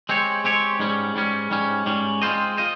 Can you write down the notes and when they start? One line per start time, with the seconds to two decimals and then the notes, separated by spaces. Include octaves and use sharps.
0.09 G#3 C4 G4 C#5
0.44 G#3 C4 G4 C#5
0.80 G#2 G3 C#4
1.15 G#2 G3 C#4
1.51 G#2 G3 C#4
1.86 G#2 G3 C#4
2.22 G#3 C4 F4 C5 D#5
2.57 F4 C5 D#5